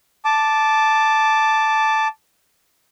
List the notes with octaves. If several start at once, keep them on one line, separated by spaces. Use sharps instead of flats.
A5 D6